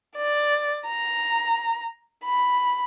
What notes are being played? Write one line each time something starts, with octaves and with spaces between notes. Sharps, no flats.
D5
A#5
B5